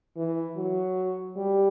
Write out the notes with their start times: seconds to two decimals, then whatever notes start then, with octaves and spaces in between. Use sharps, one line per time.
0.17 E3
0.57 F#3
1.37 G3